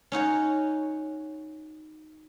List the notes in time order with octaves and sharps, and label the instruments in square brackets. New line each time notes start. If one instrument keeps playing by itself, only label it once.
[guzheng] C#4 D#4 F#4 C#5